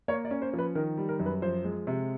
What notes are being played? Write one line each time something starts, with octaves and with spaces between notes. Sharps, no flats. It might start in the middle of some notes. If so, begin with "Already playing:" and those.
A#3 C#5
D5
C#4
C5
F3
B4
D#3 A#4
G3
A#4
F#2
B4
F3 C5
G#3
C3